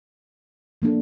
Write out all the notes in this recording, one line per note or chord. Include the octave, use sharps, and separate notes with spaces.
F3 A#3 D4 A4